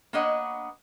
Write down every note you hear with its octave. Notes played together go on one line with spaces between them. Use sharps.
A#3 B3 D4 C#5 D#5 F#5